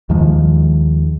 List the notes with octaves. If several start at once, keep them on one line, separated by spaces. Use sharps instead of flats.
D#2 D#3 F3 G#3